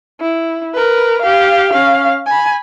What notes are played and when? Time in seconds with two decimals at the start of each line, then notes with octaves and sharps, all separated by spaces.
0.21 E4
0.74 A#4 B4
1.22 G4 F5
1.73 C#4 F5
2.27 G#5 B5